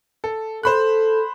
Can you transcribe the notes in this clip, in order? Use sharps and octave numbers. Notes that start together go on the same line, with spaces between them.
A4
A4 C5 B5 F#6